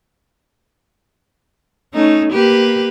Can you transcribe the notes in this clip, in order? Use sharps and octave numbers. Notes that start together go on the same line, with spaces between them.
A3 C#4 D#4
A#3 G4 B4